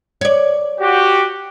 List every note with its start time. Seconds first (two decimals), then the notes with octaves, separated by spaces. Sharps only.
0.21 C#5 D5
0.81 F#4 G4